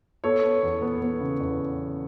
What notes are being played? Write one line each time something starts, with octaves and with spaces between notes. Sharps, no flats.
B3 A4 C#5
B3
E2
B3
B3
C#3
E2